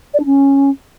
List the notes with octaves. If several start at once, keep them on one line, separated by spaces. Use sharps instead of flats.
D5
D4
C#4